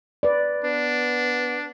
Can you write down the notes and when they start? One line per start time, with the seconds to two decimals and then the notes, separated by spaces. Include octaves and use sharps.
0.23 B4 D5
0.65 B3 D4